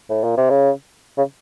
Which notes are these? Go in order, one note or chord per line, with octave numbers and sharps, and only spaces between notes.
A2
A#2
C3
C#3
C#3